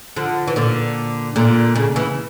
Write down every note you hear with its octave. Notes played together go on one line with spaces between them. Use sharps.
D3 F3
E3
A#2 D3
A#2 D3
C#3
C#3 E3